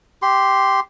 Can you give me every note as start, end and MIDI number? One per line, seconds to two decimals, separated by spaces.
0.22 0.80 67
0.22 0.80 84